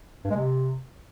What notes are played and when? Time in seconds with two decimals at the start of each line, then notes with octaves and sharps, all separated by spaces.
0.24 G2
0.30 G#3
0.36 C3